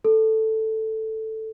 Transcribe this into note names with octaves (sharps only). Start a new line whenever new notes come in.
A4